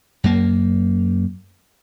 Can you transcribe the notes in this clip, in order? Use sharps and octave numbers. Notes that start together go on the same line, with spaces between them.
F#2 A#3